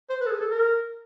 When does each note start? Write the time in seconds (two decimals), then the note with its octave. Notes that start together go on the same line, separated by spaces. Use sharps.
0.10 C5
0.20 B4
0.27 A4
0.31 G#4
0.41 A4
0.51 A#4